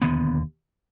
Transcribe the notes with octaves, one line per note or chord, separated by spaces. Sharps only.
E1 D#2 D3 B3